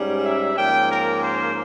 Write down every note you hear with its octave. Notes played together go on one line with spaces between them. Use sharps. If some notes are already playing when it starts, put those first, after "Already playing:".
Already playing: G#2 G3 C#4
E5
G#2 F3 A#3 C#4 G5
A#4
C5